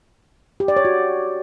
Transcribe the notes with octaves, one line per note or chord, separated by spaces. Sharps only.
G4
D5
C#5
F#4